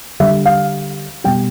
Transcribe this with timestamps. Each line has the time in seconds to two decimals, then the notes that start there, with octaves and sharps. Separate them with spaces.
0.20 D3 G3 E5
0.46 F5
1.24 B2 G3 G5